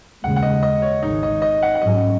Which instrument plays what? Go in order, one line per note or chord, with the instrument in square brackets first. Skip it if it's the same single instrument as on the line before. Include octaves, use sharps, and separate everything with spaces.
[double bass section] D#2 C#3 G#3 [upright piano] F#5
[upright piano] F#5
D#5
D#5
C#5
[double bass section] G#1 G#2 D#3 G#3 [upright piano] D#4
[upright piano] D#5
D#5
F#5
F#5
[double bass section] G#2 F#3 C#4 [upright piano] D#5